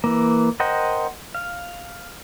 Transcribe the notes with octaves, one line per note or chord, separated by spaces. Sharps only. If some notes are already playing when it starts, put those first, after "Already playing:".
E3 A#3
A#4 C5 D#5 F#5 G5
F5